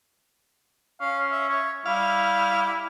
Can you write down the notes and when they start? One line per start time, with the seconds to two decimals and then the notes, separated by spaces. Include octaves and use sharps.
1.01 C#4 F5
1.32 E5
1.49 C#5
1.86 G3 E4 F5